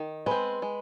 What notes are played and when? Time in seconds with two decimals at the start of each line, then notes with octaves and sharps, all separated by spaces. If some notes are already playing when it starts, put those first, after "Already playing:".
Already playing: D#3
0.26 G#3 C4 B4
0.62 G#3